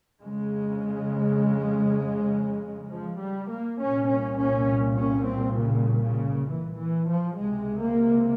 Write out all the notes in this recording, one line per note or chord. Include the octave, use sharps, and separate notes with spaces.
F2 C#3 G#3
F3
G3
A#3
C2 A#2 C#4
C#4
C#4
C#4
C4
C#3
C#3
E3
E3
F3
C#2 C3 G#3
A#3